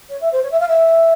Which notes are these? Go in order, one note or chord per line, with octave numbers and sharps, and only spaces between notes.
C#5
E5
C5
C#5
E5
F5
E5